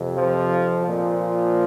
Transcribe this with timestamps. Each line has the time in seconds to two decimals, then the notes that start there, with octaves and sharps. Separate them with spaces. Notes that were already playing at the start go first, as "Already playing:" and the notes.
Already playing: F2 C3
0.15 F3
0.83 A#2 F3